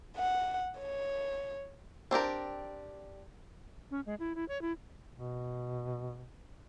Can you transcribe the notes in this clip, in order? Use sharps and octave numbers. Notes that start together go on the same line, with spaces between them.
F#5
C#5
C4 D4 G4 A#4
C#4
G#3
E4
E4
C#5
E4
B2